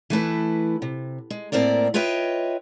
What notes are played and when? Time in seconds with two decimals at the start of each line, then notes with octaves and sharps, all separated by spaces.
0.10 E3 A3 E4 B4
0.82 C3
1.30 G#3
1.52 A2 A#3 C4 A#4 D5
1.94 F4 B4 C#5 D#5 E5 G5